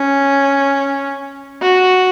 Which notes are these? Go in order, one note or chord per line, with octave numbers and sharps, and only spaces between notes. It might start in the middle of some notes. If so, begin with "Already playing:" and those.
Already playing: C#4
F#4